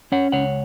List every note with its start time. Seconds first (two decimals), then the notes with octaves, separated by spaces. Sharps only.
0.12 C#4 C#5 F#5
0.32 C#2 C#5 F#5